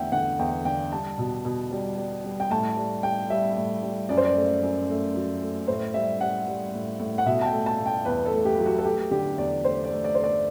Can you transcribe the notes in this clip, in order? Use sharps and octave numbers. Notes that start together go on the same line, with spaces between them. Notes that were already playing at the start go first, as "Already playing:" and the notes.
Already playing: E2 D3 A3 E5 F#5 G5
D3 F#5
E2 G5
D3 G5
G3 A5
B2
B2
G3
G3
G3
G5
A2 A5
G3
G3 G5
G3 E5
A2
G3
F#2 D5
C5
D5
A3
F#2
A3
F#3
A3
A2 C5
G3 E5
G3 F#5
G3
A2
A2
F#5
B2 E5
A5
G5
A3
A5
B2
G5
E2 B4
A4
A3
G4
F#3
F#4
A4
A3 G4
D3 G4
E2 D5
A3 C5
D5
A3
D5
A3 C5
D5